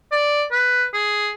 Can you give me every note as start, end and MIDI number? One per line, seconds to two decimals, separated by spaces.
0.12 0.44 74
0.52 0.84 71
0.94 1.30 68